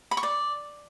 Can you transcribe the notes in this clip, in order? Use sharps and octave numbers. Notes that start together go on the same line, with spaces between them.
B5
C#6
D5